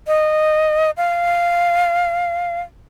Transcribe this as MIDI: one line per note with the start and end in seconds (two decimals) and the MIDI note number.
0.07 0.91 75
0.97 2.61 77